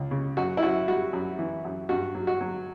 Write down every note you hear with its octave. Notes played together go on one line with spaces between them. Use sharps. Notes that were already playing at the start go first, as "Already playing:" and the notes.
Already playing: C#2
C#3
F#2 F#4
E4
F#2 F#4
G3 F#4
F#2
E3
F#2
G2 F#4
F#3
F#4
F#3